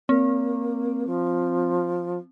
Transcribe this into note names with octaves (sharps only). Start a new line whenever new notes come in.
A#3 C4
F3